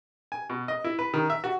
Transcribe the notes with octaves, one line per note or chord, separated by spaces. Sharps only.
G#5
B2
D#5
E4
B4
D#3
E5
F#4